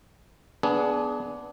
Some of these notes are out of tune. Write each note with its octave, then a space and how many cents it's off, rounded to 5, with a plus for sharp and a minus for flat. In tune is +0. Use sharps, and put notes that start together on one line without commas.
B3 +0 D4 -10 G#4 +20